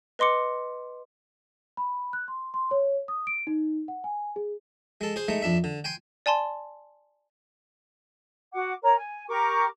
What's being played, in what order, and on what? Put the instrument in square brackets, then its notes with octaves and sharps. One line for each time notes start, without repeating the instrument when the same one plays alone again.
[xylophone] B4 D#5 C6 D6 C#7
[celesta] B5
F#6
C6
C6
C#5
D#6
D7
D#4
F#5
G#5
G#4
[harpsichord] G#3 A4
G#4 C5
G#3 A3 D#4
F2 D4 E5
D3
G5 G#5 C6
[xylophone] D5 G#5 A5 C6
[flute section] F#4 F#5 D6
A#4 C#5 A#5
G#5
G4 A#4 C#6 D6